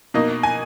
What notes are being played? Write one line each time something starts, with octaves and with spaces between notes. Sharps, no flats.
B2 A#3 D#4
G#5